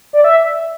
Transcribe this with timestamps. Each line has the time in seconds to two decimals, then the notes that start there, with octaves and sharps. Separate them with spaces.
0.13 D5
0.24 E5